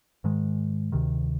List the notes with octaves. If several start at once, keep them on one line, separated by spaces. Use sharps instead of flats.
G#2 D#3 G#3
D2 C3 D#3